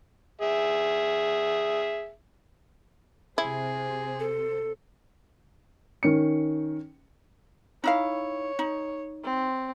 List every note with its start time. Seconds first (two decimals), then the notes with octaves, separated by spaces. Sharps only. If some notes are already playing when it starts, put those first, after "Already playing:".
0.41 G#4 E5
3.38 C3 E4 G#4 C5
4.20 A4
6.03 D#3 C#4 C#7
7.84 D#4 E4 C#5 F5
8.59 D#4
9.24 C4